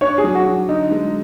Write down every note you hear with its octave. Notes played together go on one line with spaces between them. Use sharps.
D4 C#5
G#4
F#3
F#4
F#3
D3 D#4
G#3